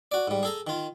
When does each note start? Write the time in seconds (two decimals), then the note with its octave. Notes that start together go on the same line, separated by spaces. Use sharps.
0.12 F#4 D5
0.27 G#2 G3
0.43 G#4 A4 A#5
0.67 D#3 F4